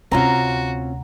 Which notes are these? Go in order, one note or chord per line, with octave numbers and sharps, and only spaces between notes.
D2 C3 C4 C#4 F4 F#4 A#5